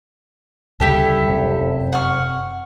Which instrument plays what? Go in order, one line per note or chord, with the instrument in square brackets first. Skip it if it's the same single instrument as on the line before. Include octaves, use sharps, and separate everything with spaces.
[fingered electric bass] D2 C#3 G3 [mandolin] E4 G4 A4
[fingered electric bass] F1 F#2 C3
[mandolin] F#5 C#6 F6